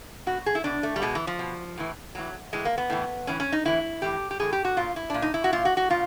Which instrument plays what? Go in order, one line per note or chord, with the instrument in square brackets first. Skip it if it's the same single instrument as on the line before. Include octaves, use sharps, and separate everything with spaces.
[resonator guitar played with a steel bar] B2 F#4
G#4
E4
B2 D4
A3
G3
B2 G#3
E3
F3
B2
A2 E3
A2 E3 F#3
A2 E3 G#3
A#3
B3
A2 E3
A2 E3 C#4
C#4
D#4
A2 E3 E4
A2 E3 G4
G4
A2 E3 G#4
G4
F#4
A#2 F4
E4
A#2 D4
D#4
E4
F#4
A#2 F4
F#4
F#4
A#2 F4